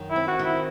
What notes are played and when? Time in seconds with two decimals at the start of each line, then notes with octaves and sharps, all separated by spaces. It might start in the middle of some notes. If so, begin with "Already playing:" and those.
Already playing: F#2 D#3
0.11 E4
0.16 C4
0.28 F#4
0.39 D#3
0.45 E4